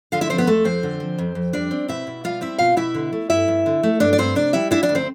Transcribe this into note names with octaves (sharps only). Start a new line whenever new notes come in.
D3 F4 F5
E4 E5
F3 C4 C5
B3 B4
F2 A3 A4
F2 C4 C5
D3
F3
F2
F2
G3 D4 D5
C4
B2 E4 E5
B2
G3 F4 F5
C4 E4 E5
B2 F4 F5
B2 E4 E5
D3
A3
G2 E4 E5
G2
D3
A3
G2 D4 D5
D5
G2 C4 C5
C3 D4 D5
G3 E4 E5
D4 E4 E5
D4 D5
D2
C4 C5